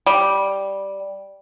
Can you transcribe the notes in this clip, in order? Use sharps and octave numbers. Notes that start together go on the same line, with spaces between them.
G3